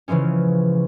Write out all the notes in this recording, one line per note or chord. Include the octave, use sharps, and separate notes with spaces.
C#3 E3 F3 G#3 C#4